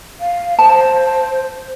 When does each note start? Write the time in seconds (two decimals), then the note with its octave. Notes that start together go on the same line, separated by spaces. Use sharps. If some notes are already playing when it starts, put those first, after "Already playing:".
0.20 F5
0.59 C5 A5